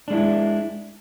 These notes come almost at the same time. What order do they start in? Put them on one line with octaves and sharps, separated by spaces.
D4 G#3 E4